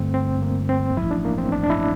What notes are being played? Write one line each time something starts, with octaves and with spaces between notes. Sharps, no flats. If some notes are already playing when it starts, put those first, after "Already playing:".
Already playing: G2 D3 A3 C4
C4
A#3
C4
A1 G2 F3 E4
D4
A#3
C4
D4
D4
E4